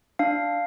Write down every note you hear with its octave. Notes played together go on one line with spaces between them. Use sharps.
D4 F5